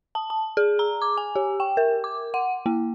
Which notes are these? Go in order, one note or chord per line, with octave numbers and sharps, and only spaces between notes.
A5
A5
G#4
A#5
D6
G#5
G4
G5
A#4
D6
F#5
A#3